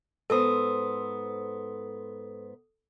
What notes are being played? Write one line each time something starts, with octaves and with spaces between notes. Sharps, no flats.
G#2 B3 A4 C5 D#6